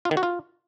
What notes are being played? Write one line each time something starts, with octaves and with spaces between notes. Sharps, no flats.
F4
D#3
F#4
F4